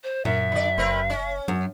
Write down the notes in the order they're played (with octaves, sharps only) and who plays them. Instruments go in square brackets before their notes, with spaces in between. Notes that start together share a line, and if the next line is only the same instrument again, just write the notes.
[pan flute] C5
[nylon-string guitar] F#2 [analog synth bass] A#2 [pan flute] E5
[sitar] D3 D5
[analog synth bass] F#1 [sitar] C4 A#4 B4
[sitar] C#4
[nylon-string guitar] F#2 [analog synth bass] F#3